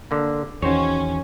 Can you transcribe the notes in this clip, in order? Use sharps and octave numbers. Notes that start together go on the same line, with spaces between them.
D3 A#3
E2 D#3 C#4 F#4 C5 C#5